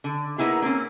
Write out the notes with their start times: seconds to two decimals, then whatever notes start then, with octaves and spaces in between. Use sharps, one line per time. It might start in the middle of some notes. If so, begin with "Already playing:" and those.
0.04 D3
0.38 A#3 B3 D#4 E4 G#4
0.62 A#3 C4 C#4